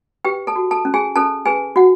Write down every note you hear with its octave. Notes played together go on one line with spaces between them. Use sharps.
G4 B4 G5
A4 A5
F#4
A4 A5
C#4
G#4 G#5
C#4 A4 A5
G#4 B4 G#5
F#4 F#5